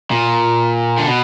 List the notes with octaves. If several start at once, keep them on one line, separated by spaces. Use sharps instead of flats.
A#2
D3
B2